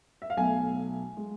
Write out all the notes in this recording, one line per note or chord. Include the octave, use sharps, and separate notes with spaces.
E5
F5
B1 B2 A3 G#5
G#3